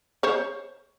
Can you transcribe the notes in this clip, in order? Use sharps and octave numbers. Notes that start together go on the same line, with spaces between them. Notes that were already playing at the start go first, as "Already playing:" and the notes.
C5 C#5